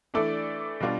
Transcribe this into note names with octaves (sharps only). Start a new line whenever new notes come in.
E3 A3 D4 A4 D5
B2 G3 D4 F4